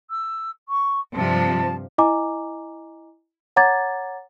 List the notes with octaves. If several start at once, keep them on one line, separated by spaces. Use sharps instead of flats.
E6
C#6
G2 C3 F3 A5
E4 D#5 G#5 A#5 D6
C#5 F#5 A#5 D6 G#6 A6